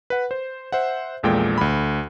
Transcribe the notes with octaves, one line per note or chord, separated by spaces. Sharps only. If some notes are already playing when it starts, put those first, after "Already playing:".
B4 F#5
C5
C5 E5 F#5
A#1 E2 A#2 G#3 A4 G5
D2 B5